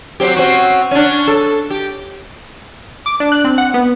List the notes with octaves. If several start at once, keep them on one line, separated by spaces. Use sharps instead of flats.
F#3 C4 G4
C4 C#4 F#4
C#4 D4
A4
G4
D6
D4
F#6
C4
F#5
B3